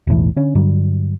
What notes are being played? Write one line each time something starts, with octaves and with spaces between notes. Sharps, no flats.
E1 B1 A2 E3
D3 C#4
G2 D3 F#3 G3